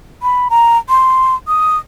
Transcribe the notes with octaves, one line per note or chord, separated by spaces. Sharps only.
B5
A#5
C6
D#6